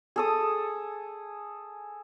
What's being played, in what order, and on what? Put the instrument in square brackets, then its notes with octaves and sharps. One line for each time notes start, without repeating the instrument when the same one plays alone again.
[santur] G#4 A4 D#6